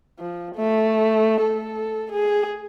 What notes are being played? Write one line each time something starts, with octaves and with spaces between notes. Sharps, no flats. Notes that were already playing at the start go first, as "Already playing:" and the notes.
F3
A3
A4
G#4